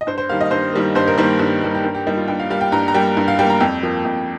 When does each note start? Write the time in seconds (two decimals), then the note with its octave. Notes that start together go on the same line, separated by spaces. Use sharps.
0.01 D#5
0.07 G2 C5
0.18 C5
0.29 D#3 G3 A#3 F5
0.41 D#5
0.51 G2 C5
0.73 D#3 G3 A#3
0.95 G2 C5
1.08 A#4
1.18 D#3 G3 A#3 C5
1.39 G2
1.62 D#3 G3 A#3
1.75 G4
1.84 G2 A#4
1.95 G4
2.06 G3 A#3 D#4
2.17 F4
2.28 G2 G5
2.40 F5
2.50 G3 A#3 F5
2.61 G5
2.72 G2 A#5
2.88 A#5
2.94 G3 A#3 G5
3.17 G2
3.28 F5
3.39 G3 A#3 G5
3.50 A#5
3.61 F2 G5
3.83 F3 A#3
4.05 F2